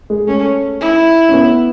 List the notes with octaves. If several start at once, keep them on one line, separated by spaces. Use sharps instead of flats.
G#3
A3 C#4
E4
C#4
B3